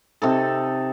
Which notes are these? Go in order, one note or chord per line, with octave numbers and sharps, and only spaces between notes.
C3 D#4 A4